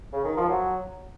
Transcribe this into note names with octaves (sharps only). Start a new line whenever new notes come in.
C#3
D#3
F3
F#3